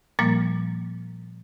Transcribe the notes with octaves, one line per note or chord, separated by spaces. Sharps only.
A#2 F3 G3 A#3 A6